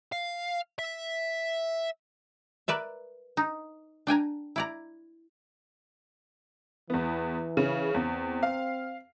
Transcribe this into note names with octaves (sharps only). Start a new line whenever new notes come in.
F5
E5
A#4 B4 D5 E5
D#4
D4 G5 G#5 A#5
E4 D5 A#5
E2 E3 B3
C#3
E2 C4
F5